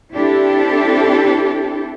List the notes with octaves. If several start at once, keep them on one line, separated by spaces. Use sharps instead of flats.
C4 D4 E4 G4 A4